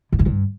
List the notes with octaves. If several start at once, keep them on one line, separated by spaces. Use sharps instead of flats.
D3
E3
G2